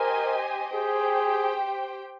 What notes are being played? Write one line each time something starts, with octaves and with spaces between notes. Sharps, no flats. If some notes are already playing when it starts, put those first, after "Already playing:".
Already playing: G4 A#4 C5 D#5 G#5
G4 G#4 C5 G5